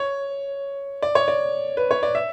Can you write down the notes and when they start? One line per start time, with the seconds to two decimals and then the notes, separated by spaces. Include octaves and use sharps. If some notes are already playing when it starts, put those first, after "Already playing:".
Already playing: C#5
1.02 D5
1.15 C#5
1.28 D5
1.77 B4
1.91 C#5
2.03 D5
2.15 E5